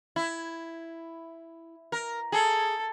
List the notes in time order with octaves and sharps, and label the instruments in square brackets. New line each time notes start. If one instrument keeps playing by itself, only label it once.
[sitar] E4
A#4
[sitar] G#4 [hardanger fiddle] A4